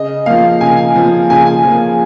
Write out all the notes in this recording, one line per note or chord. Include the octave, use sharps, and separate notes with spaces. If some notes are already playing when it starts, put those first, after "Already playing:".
Already playing: C#3 D#5
F3 A#3 F5
C#3 G#5
F3 A#3
C#3 G#5
F3 A#3